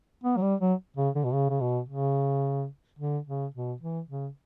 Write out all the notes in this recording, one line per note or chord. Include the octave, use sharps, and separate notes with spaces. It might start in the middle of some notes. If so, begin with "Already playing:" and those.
B3
F#3
G3
F#3
C#3
D3
B2
C#3
C#3
B2
C#3
D3
C#3
B2
E3
C#3